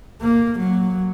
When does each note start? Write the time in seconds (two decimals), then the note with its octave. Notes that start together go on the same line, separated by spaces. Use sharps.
0.21 A#3
0.60 F#3